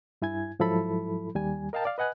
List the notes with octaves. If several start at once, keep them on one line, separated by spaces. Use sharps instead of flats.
G2 E4 G#5 G#6
G#2 F3 F#3 E4 A4 B5
D#2 G3 G#5
A#4 D#5 F5 G5 A5 A#5
D5 F5
B4 D#5 F#5 G#5 F#6